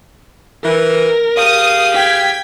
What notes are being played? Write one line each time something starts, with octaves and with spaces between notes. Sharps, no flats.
E3 A#4
G4 G#4 F5 D#6
G5 G#6 B6